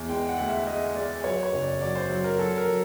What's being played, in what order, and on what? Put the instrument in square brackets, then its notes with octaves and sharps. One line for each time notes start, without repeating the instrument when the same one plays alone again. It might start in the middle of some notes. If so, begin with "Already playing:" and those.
Already playing: [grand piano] E2
G#3 G5
F#5
D2
E5
G#3 D#5
G#3 D5
F#3 C#5
C#5
F#1
D5
F#3 D5
C5
F#3
A#4
F#3 A4
A#4
F#3